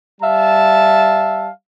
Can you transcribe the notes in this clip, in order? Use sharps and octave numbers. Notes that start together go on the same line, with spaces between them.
G3 E5 F5 A5